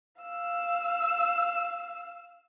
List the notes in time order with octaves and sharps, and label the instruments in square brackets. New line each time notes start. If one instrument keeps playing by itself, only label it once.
[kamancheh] F5 E6